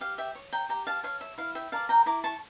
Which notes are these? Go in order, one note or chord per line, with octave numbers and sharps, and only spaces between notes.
G4 F5
E5 G5
C#5
G5 A#5
G4 G5 A#5
F5 A5
C#5 F5
E5
E4 F5
E5 G5
A#4 D5 F5 A5
G5 A#5
E4 A#5 D6
A5 C#6